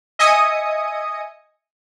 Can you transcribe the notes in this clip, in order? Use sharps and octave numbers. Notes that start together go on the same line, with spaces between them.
D#5 E5 G#5 D#6 C#7